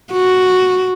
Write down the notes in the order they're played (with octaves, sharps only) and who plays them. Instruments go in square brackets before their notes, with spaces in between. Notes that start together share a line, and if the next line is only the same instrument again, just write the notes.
[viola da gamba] F#4